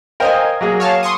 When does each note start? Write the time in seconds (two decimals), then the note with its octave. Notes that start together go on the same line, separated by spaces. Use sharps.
0.20 A#4 C5 D#5 F5 G5 G#5
0.61 F#3 A#3 G#4
0.80 C#5 F5 A5
1.03 C6 C#6 D#6